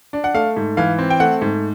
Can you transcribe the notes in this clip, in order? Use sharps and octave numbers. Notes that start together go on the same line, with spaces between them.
D4
F#5
A3 F5
G#2
E3 F5
C4
G5
A3 F#5
G#2